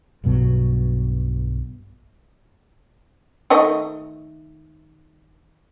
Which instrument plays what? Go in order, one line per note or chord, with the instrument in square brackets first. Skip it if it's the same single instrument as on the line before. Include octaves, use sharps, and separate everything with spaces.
[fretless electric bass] B1 G2 B2 F#3
[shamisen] D#3 A3 D#5